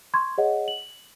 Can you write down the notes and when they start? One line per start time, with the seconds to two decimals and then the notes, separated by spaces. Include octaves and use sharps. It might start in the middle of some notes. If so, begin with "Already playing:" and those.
0.14 C6 C#6 G#6
0.38 G#4 C#5 D#5 F#5
0.68 F#7